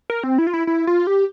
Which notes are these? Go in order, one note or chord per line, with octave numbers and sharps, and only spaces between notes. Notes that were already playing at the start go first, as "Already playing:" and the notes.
A#4
C4
E4
F4
E4
E4
F4
G4